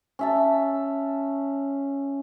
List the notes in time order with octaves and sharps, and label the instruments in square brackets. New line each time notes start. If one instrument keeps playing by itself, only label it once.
[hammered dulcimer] C#4 E5 A5